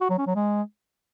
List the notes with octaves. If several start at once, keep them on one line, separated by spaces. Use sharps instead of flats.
F#4
F#3
C#4
F#3
G#3